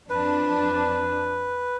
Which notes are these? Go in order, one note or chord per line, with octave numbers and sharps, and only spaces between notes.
F2 D4 B4